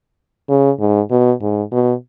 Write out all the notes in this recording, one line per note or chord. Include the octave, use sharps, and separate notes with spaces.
C#3
G#2
B2
G#2
B2